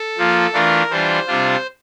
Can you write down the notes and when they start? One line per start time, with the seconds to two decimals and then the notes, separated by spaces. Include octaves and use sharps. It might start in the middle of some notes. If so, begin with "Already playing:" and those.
Already playing: A4
0.18 F3 A#3 F4
0.54 E3 A3 D4 F4 A#4
0.90 E3 G3 D4 F4 C5
1.27 C3 G3 D4 F4